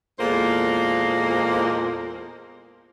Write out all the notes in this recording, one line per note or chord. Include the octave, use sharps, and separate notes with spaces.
E2 A#2 G#3 A#3 A4 C5